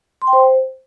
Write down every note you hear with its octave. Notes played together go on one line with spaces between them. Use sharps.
C6
G5
C5